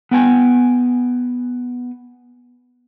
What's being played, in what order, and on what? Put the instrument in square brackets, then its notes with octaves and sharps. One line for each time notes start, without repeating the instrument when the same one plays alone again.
[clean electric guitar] B3 G5 G#5